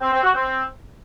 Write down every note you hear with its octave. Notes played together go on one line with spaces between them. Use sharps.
C4
C4
F#4
C4